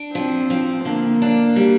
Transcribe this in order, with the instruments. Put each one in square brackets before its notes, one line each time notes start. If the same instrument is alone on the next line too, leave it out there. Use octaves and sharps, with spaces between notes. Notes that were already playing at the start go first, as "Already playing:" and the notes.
Already playing: [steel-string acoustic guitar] D4
[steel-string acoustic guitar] F3 [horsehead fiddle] C4
[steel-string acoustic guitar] F3
[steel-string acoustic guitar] D3 [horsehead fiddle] A#3
[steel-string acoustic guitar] D4
G3